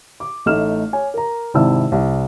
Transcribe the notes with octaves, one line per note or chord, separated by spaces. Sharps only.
D6
A1 A3 D#4 F6 E7
C#5 G#5
A#4 A#5
G#1 C3 E4 D5 A5 E6
C2